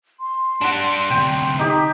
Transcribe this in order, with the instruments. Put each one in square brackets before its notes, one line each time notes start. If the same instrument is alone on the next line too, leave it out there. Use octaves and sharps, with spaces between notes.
[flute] C6
[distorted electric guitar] G3 D4 [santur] F#5 A5
[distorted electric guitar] D2 C3 [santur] G5
[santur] D#4 G4 D#5